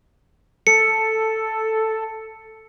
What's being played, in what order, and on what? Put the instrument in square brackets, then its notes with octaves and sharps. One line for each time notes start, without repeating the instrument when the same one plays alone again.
[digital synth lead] A4 [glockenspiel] C#7